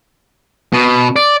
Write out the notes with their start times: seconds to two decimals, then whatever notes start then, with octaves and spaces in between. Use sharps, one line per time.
0.73 B2
1.16 D5